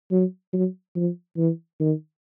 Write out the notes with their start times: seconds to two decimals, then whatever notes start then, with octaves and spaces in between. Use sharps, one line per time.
0.11 F#3
0.53 F#3
0.96 F3
1.37 E3
1.80 D#3